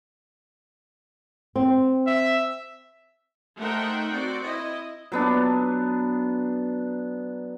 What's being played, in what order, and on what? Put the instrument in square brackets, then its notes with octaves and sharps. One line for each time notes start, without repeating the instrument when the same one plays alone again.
[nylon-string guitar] C4
[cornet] E5
[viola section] A3 D#4 A#4 C5 F#5 G5
C4 F#4 D5
E4 D#5
[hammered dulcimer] F#3 B3 D4